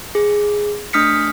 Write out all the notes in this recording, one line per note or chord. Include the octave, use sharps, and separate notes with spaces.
G#4
A3 D4 D#6 F6 B6 C#7